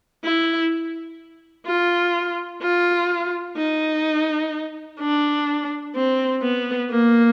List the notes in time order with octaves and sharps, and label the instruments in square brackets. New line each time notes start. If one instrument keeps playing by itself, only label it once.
[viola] E4
F4
F4
D#4
D4
C4
B3
A#3